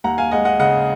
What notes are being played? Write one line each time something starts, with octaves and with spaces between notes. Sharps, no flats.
D#2 F#5 A#5
F5 G#5
G#3 D#5 F#5
D#5 F#5
C#3 D#5 F#5